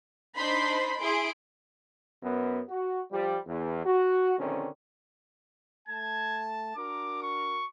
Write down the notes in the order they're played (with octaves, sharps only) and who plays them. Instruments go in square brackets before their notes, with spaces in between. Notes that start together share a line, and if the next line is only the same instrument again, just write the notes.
[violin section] D4 D#4 C5 B5 C6
E4 G#4 C6 D7
[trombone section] F#2 B3
F#4
F3 G3
E2
F#4
A#1 D3 D#3 C4 C#4
[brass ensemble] A3 A5 [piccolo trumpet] G#6
[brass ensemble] D4 F#4 A#4 [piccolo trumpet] D6
[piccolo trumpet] C#6